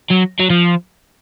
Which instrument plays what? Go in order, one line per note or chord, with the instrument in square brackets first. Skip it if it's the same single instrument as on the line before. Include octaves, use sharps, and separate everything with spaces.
[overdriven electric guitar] F#3
F#3
F3